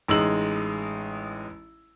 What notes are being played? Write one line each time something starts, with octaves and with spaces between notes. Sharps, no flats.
A1 G#3 D#4 E6 F#7